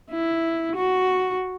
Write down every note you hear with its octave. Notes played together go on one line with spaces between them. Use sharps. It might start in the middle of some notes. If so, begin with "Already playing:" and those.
E4
F#4